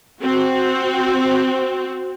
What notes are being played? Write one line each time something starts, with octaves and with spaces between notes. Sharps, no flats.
C4 F#4